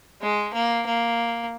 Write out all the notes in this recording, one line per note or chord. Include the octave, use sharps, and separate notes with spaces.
G#3
A#3
A#3